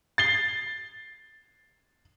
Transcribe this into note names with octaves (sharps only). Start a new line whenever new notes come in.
A6 C7 G7